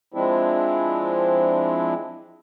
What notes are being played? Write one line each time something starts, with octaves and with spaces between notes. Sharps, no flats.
F3 G#3 C4 D4 E4